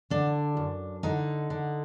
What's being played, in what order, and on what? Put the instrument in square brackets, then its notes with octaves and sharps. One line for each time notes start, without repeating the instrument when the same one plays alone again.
[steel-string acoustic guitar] D3 D4
F#2
D3 D#4
D3